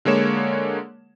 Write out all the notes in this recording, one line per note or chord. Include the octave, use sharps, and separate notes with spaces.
D3 G#3 A#3 C#5 E7